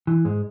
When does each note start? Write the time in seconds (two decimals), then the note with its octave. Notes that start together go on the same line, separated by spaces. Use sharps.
0.07 E3
0.25 G#2 G#3